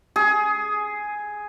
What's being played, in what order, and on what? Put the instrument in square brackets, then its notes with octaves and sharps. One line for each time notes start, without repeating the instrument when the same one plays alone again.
[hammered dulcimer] G#4